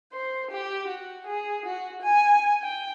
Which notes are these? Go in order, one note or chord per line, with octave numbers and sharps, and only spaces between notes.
C5
G4
F#4
G#4
F#4
G#5
G5